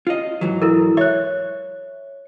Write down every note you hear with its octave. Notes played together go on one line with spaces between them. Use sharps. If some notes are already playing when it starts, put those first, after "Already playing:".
F4 D#5
G#2 E3 F#3
E4 A4 A#4
C#5 E5 F#6